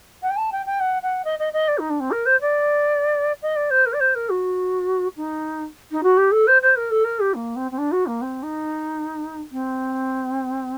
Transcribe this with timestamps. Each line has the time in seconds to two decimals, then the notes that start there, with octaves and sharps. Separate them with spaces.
0.22 F#5
0.30 G5
0.36 A5
0.52 G5
0.66 G5
0.80 F#5
1.02 F#5
1.24 D#5
1.39 D#5
1.53 D#5
1.68 D5
1.78 D#4
1.89 D4
2.00 C4
2.11 A#4
2.25 C5
2.40 D5
3.42 D#5
3.55 D5
3.70 C5
3.85 A#4
3.93 D5
4.00 C5
4.15 A#4
4.29 F#4
5.16 D#4
5.91 D#4
6.03 F#4
6.17 G4
6.31 A4
6.47 C5
6.62 C5
6.76 A#4
6.90 A4
7.04 A#4
7.19 G4
7.34 A#3
7.56 C4
7.71 C4
7.78 D4
7.91 F#4
8.06 A#3
8.21 C4
8.42 D#4
9.51 C4